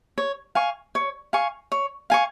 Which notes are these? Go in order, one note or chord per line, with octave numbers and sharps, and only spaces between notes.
C#5
F5 G#5 C#6
C#5
F5 G#5 C#6
C#5
F5 G#5 C#6